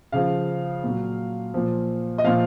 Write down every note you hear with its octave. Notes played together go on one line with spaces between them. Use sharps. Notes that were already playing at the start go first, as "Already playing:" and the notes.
C#3 F3 F5
A#2 F#3
A#2 F3
D#5
A#2 F3 F5